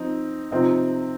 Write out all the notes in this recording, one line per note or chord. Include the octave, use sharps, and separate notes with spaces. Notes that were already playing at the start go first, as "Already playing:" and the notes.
Already playing: F3 C4 D#4
C3 F3 C4 D#4